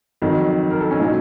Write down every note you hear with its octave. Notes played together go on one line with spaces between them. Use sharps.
F2 D#3 F#3
A#4
A4
C#4
A#2 F#3 D#4